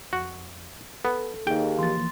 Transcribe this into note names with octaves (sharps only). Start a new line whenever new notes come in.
F2 F#4
B3 A4
D#2 G#4 F5 G5
E3 F3 A#3 C6 A6